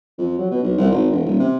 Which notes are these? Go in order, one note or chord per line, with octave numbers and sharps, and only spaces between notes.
F2
F#3
B2
B1
C2
G#1
E1
D#1
C3